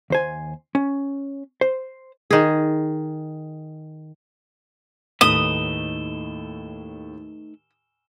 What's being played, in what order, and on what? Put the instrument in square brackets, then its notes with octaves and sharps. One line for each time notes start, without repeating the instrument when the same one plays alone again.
[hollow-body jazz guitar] D#2 C5 G#5
C#4
C5
[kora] D#3 G#4
[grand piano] D#2 A2 [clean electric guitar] A3 D#4 B4 [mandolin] D#6 [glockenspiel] E7 G7